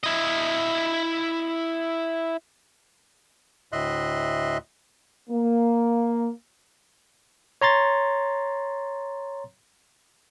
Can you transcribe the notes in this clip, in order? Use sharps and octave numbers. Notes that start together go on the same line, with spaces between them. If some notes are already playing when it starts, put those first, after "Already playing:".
E4 D#5
D2 A2 D#5 E5 C6 F#6
A#3
C#5 A#5 C6 A6